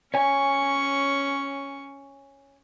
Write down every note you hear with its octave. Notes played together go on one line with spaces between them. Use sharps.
C#4 C#5 G#5 C#6